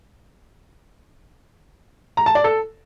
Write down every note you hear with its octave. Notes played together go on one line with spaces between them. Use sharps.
A#5
A5
D5
A4